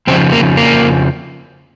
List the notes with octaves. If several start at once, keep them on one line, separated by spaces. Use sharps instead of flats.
F2 C#3 F3 C4
A#3
A#3